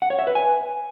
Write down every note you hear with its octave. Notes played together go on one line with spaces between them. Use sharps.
F#5
C#5
E5
B4
G#5